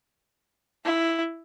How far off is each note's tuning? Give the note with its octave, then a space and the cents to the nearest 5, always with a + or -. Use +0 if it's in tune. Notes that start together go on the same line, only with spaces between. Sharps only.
E4 +5